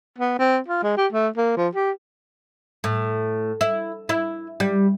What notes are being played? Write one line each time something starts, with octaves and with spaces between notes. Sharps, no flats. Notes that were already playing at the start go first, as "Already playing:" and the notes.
B3
C4
F4
G#3
G4
A3
A#3
F3
G4
A2
E4
E4
G3